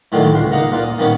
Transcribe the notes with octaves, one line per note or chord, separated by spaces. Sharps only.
A2 D3 D#3 F#3 G3 F4
C#2 C6
A#3 D#4 F#5 A#5
A#2 A#3 F4
D#6
D#3 G3 A#3 B3 C#4